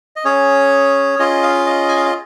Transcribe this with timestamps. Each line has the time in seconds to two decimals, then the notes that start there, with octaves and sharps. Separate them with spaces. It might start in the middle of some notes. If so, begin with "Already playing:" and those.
0.16 D#5
0.25 C#4 G#4 C#5
1.19 C#4 F4 G#4 D#5
1.43 F5
1.66 D#5
1.89 G#5
1.97 F5
2.06 D#5